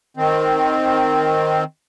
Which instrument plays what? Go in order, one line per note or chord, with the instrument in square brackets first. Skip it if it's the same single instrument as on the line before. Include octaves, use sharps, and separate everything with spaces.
[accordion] D#3 C4